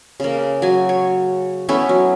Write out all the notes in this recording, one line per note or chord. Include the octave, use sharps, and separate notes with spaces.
C#3 A#3
F#3 G#5
C#5
A3 B3 C#4 E4
F#3